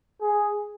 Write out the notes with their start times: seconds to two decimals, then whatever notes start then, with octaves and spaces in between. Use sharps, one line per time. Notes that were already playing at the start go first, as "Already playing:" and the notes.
0.21 G#4